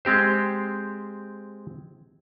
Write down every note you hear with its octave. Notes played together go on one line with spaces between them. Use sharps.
G#3 C4 G4 C5